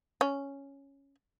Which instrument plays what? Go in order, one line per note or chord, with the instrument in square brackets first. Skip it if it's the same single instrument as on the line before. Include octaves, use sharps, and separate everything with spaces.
[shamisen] C#4